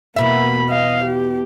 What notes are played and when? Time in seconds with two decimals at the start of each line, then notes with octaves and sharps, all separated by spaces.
0.16 E2 B2 A#3 E5 B5
0.69 D#5 F5
1.04 G4